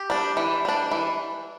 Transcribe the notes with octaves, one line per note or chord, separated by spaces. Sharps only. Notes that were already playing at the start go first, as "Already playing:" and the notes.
Already playing: G4
G3 D4
E3
G3 D4
E3